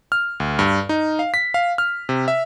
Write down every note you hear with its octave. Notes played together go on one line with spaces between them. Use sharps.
F6
D2
G2
D#4
F5
B6
F5
F6
C3
E5